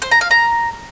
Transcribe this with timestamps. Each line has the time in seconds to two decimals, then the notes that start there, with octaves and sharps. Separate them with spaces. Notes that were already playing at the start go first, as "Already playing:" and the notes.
0.02 C5
0.11 A#5
0.21 F5
0.31 A#5